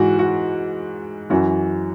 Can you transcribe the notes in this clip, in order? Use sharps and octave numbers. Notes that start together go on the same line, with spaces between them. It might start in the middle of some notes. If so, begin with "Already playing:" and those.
Already playing: G#2 E3 F#4
F#4
F#2 E3 F#4